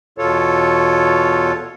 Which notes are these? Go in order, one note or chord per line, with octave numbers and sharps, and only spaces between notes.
E2 B2 F4 A4 C#5